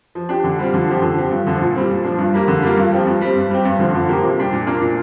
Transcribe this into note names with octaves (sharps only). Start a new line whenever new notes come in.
F3
D4 G4
D3
G3 C4 F4
D3
F3 C4 G4
D3
F3 C4 G4
G2
D3 F3
A#2
G3 C4
A#2
F3 D4
G2
G3 A#3
D3
G3 A#3 F4
G2
F3 C4 G4
G2
G3 C4
G2
G3 C4 G4
G2
D3 F3 C4 F4
D3
F3 A#3 G4
C3
G3 D4 G4
A#2
A#3 D4 F4
A#2